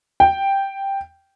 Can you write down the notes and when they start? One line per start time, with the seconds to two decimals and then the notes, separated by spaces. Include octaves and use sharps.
0.20 G5